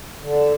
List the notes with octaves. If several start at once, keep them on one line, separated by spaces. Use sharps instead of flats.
D3